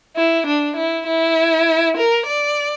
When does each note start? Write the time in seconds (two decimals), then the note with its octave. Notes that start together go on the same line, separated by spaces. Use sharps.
0.16 E4
0.47 D4
0.76 E4
1.07 E4
1.97 A#4
2.27 D5